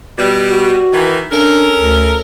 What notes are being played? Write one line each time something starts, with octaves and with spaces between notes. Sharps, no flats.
B2 G3
F#4
D#3 E3
C#4 D4 A4 A#4
D2